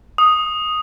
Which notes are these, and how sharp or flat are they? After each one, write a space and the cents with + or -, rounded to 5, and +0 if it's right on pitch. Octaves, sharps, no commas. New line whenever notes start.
D#6 +0